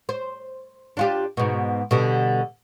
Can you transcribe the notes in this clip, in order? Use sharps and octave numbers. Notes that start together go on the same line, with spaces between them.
C5
D4 F4 G4
G#2 B2
B2 D3 G3